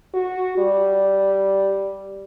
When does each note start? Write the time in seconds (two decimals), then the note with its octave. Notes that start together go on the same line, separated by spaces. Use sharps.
0.14 F#4
0.58 G3